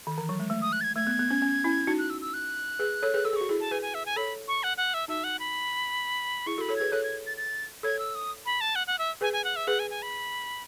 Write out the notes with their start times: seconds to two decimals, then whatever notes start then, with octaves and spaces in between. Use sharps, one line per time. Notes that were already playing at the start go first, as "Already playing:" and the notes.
0.07 D#3
0.18 E3
0.29 F#3
0.40 G#3
0.50 A3
0.62 D#6
0.73 F#6
0.81 A6
0.84 G#6
0.95 A3 G#6
1.07 B3
1.19 B3
1.30 C#4
1.42 C#4
1.64 C#4 E4
1.87 D#4 F#4
1.99 F#6
2.10 E6
2.21 E6
2.34 F#6
2.79 G#4 B4
3.02 A4 C#5
3.14 G#4 B4
3.25 A4 E6
3.33 G#4
3.36 F#4 C#6
3.49 E4 G#4
3.60 A5
3.71 G#4 B4 G#5
3.82 G#5
3.94 E5
4.06 G#5
4.16 A4 C#5 B5
4.48 C#6
4.63 F#5
4.77 F#5
4.94 E5
5.08 D#4 F#4 E5
5.24 F#5
5.39 B5
6.46 E4 G#4 C#6
6.58 F#4 A4
6.61 B5
6.69 A4 C#5
6.76 G#4 B4 G#6
6.92 A4 C#5 F#6
7.03 G#6
7.27 A6
7.37 A6
7.83 A4 C#5 G#6
7.99 E6
8.15 D#6
8.46 B5
8.61 A5
8.75 F#5
8.87 F#5
8.99 E5
9.21 G#4 B4 G#5
9.33 G#5
9.44 F#5
9.56 E5
9.67 G#4 B4 F#5
9.79 G#5
9.90 G#5
10.02 B5